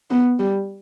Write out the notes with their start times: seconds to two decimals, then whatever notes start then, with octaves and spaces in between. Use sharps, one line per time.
0.11 B3
0.39 G3